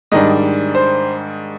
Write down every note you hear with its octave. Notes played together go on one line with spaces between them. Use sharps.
G#2 D#3 G3 D4 D#5
C5